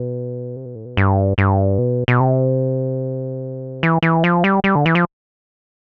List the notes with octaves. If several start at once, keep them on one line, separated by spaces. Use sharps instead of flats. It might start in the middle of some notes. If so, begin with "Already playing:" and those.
Already playing: B2
C3
B2
A2
B2
G2
G2
B2
B2
C3
E3
E3
F3
G3
G3
D3
E3
F3